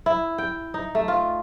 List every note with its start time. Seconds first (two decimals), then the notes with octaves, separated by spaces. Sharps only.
0.06 E4
0.38 G5
0.74 D#4
0.95 A3
1.08 F4